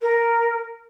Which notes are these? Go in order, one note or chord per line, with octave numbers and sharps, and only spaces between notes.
A#4